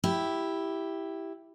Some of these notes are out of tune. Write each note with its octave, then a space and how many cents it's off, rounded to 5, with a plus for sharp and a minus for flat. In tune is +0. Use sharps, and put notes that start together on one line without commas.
E4 +0 G4 +0